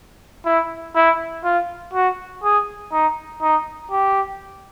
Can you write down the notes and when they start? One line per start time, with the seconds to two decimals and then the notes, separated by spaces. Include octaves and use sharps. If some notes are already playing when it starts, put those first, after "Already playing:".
0.45 E4
0.95 E4
1.44 F4
1.94 F#4
2.44 G#4
2.92 D#4
3.42 D#4
3.91 G4